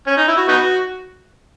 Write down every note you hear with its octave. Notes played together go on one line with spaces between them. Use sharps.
C#4
D#4
E4
F#4
B3 D#4 F#4